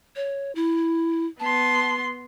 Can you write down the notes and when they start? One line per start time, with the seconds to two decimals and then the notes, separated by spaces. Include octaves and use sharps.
0.16 C#5
0.55 E4
1.40 B3 A5 C6